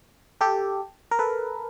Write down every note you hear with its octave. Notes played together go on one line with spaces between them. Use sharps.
G4 A4
A#4
A4 B4